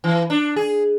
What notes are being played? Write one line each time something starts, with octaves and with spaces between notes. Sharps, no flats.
E3
D4
G#4